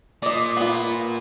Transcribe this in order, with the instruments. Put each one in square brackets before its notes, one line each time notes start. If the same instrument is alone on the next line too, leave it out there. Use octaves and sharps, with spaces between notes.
[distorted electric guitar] A#2 [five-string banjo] D5 D#5
[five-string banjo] B3 F4